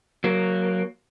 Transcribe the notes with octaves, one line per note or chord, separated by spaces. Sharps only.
F#3 A#3